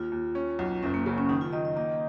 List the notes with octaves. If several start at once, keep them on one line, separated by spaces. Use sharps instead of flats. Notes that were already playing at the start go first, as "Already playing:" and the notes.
Already playing: D#2 F4
D#2
C#4
B1
F#1 C#4
A#3
C#3 A#3
C#4
D#3 D#4
F4
D#3 D#5
D#5
A#3 D#5